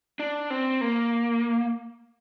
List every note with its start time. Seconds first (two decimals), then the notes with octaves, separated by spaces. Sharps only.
0.20 D4
0.50 C4
0.81 A#3